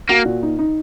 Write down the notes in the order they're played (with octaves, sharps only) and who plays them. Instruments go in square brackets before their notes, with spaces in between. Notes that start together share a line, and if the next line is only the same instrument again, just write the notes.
[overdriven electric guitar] A#3 [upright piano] F#4
[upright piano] A#2
D#4
D#4